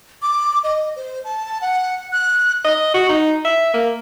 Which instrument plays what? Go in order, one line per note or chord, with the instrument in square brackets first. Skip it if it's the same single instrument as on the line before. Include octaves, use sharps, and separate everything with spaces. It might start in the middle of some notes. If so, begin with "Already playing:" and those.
[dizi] D6
D#5
C5
A5
F#5
F#6
[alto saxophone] D#5
F#4
D#4
E5
A#3